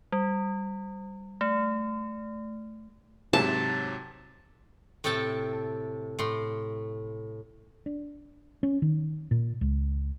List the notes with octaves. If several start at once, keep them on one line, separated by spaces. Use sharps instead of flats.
G3
A3
G#2 C3 F#3 A5
A2 C3 A4 G5 A5
A2 C6
D4
C#4
D#3
A#2
C#2